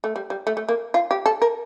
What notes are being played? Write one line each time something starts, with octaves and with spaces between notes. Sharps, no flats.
A3
G3
G3
A3
A3
A#3
F4
G4
A4
A#4